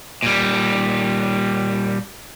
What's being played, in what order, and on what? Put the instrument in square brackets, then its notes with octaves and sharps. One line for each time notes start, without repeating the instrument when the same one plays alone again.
[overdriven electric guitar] A#2 G3